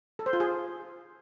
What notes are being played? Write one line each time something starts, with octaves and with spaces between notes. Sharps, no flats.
A4
C5
F4
G#4